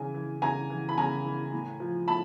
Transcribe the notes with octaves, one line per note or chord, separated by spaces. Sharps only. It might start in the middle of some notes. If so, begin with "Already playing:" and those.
Already playing: C#3 E3 G#5
E3
C#3 G#5 A#5
E3
B5
C#3 G#5 A#5
E3
A2
F3
A2 A5 B5